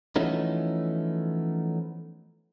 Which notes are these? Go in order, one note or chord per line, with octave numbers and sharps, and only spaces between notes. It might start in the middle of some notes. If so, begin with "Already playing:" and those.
E3 F3 A3 B3 C#4 D#4